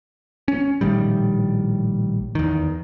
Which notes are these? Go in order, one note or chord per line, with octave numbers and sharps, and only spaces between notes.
C#4
A#1 A2 D#3 G3
E2 D#3